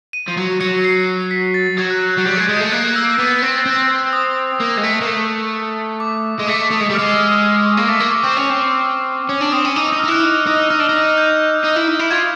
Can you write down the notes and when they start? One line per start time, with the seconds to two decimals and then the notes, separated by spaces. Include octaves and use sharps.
0.13 D#7
0.28 F3
0.37 F#3
0.60 F#3 C#7
0.84 C7
1.31 B6
1.54 A6
1.78 F#3 G#6
1.90 F#6
2.03 F#6
2.14 G6
2.17 F#3
2.25 G3 G6
2.37 G#3
2.40 G#6
2.49 G#3
2.57 G6
2.60 A3
2.72 A#3 F#6
2.96 E6
3.19 B3
3.42 C4
3.66 C4
4.13 D#6
4.60 A#3
4.77 G#3
4.83 A3
5.01 A#3
5.07 A3
6.00 D6
6.39 G#3
6.47 A3 D6
6.71 A3 D#6
6.80 G#3
6.90 G3
6.95 F6
6.99 G#3
7.12 E6
7.18 F6
7.42 F6
7.66 C#6
7.77 A#3
7.88 A3 D6
8.00 A#3 C#6
8.12 D6
8.23 C4 C#6
8.37 C#4
8.50 C4
9.29 C#4
9.41 D4
9.52 C4 D#6
9.65 C#4
9.76 D#4 D6
9.87 E6
9.92 D#4
9.99 F6
10.04 D#4
10.08 E4 F#6
10.23 D#4 F#6
10.46 D#4 F6
10.70 D#4 F6
10.80 D4
10.89 D#4 F6
11.18 G6
11.64 D#4
11.76 E4
11.88 D#4
11.99 E4
12.10 F4 G#6